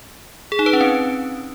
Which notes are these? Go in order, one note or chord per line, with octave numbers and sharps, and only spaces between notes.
G#4
D#4
B4
C#4
C4